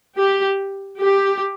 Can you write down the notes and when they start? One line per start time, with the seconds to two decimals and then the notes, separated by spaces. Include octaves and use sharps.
0.19 G4
1.02 G4